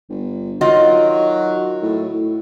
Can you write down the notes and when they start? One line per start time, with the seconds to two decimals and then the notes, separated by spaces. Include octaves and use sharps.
0.10 G1
0.61 D#3 F#3 F4 D#5
1.82 A2
2.13 A2